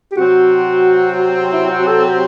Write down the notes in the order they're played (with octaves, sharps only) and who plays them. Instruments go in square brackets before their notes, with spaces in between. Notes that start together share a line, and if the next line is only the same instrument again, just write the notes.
[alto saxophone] G4
[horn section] C3 F#3 C4 [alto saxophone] F#4
[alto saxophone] E4
F#4
A4
G4